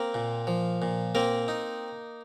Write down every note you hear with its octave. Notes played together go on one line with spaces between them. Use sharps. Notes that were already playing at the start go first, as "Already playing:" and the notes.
Already playing: A#3 C4 A#4
A#2
F3
A#2
A#3 C4 A#4
D#4